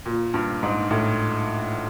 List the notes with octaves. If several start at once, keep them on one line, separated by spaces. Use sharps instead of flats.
A#2
G2
G#2
A2